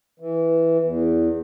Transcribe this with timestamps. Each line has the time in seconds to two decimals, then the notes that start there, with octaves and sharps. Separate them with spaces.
0.20 E3
0.84 E2